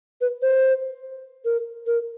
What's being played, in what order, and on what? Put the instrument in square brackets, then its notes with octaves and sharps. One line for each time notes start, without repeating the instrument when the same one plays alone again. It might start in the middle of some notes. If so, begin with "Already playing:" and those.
[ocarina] B4
C5
A#4
A#4